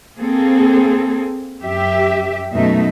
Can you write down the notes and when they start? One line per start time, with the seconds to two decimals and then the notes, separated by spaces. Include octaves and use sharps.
0.19 A#3 C4 G#4 A4
1.62 F#2 G4 E5
2.53 F#2 B2 A3 D#4 E5